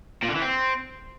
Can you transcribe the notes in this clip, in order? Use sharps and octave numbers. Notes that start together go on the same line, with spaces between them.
A#2
D3
E3
C4